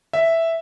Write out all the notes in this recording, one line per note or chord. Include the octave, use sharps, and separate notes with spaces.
E5